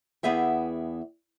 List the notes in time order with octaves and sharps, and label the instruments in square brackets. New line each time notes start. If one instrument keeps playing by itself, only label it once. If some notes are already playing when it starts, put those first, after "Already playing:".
[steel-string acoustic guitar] E2 B3 G#4 E5 G5